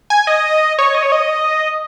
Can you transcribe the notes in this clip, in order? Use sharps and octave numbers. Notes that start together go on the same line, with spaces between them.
G#5
D#5
C#5
D#5
C#5
D#5